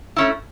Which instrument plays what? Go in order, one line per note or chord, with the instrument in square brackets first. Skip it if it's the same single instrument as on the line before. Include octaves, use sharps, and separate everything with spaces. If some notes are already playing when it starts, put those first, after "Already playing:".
[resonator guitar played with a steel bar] A3 C#4 E4